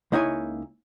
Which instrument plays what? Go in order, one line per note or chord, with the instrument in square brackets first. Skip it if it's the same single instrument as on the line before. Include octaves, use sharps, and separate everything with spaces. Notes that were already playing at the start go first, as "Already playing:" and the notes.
[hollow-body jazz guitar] C#2 A#3 D#4 E4 C#5 G#5